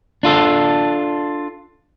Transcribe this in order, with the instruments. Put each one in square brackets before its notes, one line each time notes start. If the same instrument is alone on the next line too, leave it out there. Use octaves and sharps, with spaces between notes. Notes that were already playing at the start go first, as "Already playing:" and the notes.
[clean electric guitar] D4 F4 A4